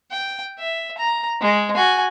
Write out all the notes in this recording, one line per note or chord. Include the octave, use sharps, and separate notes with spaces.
G5
E5
A#5
G#3
F#4 G#5